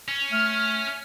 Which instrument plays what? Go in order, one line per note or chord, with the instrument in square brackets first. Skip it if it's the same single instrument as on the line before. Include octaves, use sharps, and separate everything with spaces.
[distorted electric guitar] C#4
[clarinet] A3 [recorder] F6